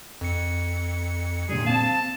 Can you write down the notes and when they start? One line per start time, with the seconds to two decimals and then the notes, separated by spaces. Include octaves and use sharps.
0.21 F2 C#7
1.49 A#2 D3 G3 G#4
1.67 C4 F5 A5